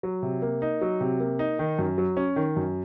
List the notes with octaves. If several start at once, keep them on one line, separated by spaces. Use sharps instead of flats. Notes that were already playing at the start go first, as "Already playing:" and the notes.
F#3
C3
A#3
D#4
F#3
C3
A#3
D#4
D#3
F#2
F#3
C#4
D#3
F#2